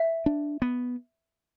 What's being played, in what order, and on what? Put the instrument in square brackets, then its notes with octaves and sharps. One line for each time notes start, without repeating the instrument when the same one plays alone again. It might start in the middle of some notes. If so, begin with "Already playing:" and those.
Already playing: [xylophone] E5
[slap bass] D4
B3